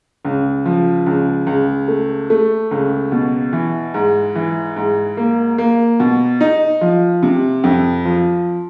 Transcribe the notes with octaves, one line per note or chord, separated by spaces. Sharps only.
C#2
F3
C#2
C#2
A3
A3
C#2
B2
E3
G#2
E3
G#2
A#3
A#3
B2
D#4
F3
C3
F2
F3